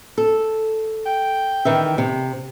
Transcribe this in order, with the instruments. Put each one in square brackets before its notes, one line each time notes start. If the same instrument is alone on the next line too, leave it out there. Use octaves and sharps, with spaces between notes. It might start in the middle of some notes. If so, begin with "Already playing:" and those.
[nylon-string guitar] A4
[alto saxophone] G5
[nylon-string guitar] D#3 E3 E5
C3